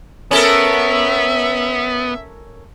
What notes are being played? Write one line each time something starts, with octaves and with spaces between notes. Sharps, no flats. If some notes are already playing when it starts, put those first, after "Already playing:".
B3 C#4 A4 A#4 E5